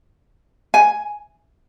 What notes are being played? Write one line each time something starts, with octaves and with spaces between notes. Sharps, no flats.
G#5